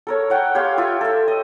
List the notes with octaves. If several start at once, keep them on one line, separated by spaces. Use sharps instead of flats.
A4 A#4 C#5
C#5 F#5 G5
G4 C#5 F5 C6
F4 G4 E5
A4 E5
D#5